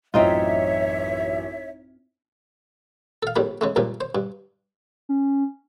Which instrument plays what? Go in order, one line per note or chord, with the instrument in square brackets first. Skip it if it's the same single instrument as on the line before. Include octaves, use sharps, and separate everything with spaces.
[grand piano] A1 F#2 [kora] C4 D#4 F4 [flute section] C#5 E5
[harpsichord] A4 F5
A#1 A2 G3 B5
C#3 G#3 A3
C#2 G2 A#2 F3
C5
G2
[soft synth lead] C#4